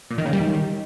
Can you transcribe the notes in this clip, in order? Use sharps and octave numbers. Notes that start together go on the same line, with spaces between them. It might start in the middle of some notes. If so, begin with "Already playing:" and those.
A#2
D#3
C#3
G3
D#3